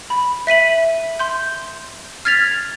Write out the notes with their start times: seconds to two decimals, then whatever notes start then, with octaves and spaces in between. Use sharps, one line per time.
0.10 B5
0.47 E5 B6 D#7 F#7
1.19 C6 G6
2.25 F6 G#6 A6 B6 F7